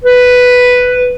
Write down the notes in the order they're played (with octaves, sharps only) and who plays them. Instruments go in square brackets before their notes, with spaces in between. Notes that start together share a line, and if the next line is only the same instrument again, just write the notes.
[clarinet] B4